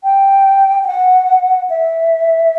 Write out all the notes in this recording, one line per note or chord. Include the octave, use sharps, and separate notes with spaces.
G5
G5
F#5
E5